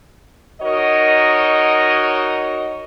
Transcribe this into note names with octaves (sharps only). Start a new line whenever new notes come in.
D#4 F#4 A#4 C#5 D#5